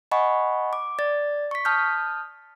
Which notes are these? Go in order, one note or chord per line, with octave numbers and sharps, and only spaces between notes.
D#5 F#5 G#5 B5 C#6
D6
D5 A6
C#6 B6
A5 D#6 F6 G6